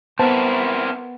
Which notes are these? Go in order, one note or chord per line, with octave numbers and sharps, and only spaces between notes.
B3 C4 E4 A#4 C5 A5